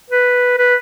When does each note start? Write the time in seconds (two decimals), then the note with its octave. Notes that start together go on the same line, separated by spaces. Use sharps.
0.10 B4
0.58 B4